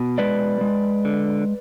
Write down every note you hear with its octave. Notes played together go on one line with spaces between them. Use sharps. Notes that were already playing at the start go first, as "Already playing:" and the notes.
Already playing: B2
G#3 B4 D5
G#3
D3